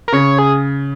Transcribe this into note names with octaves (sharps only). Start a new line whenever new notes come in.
A#4
C#3 C#5
G#4